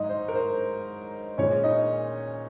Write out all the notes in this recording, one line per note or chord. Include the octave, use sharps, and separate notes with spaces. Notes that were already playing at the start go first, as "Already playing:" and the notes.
Already playing: G#2 F#3 D#4 D#5
C5
A#4
C5
A#2 G#3 C#4 C#5
D#4 D#5